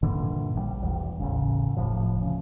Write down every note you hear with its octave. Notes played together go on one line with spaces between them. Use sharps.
G2 A#2 D3 E3
A#1 D#3 G3
E1 E2
D#1 A1 C#3
F1 A2 F3
D2 C#3